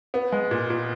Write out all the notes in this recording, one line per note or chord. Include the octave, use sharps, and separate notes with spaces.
B3
G#3
A#2
A#2